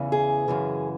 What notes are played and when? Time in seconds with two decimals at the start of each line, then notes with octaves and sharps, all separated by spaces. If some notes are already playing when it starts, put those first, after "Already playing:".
Already playing: E2 C#3 E3
0.12 G#4
0.48 F#2 C#3 E3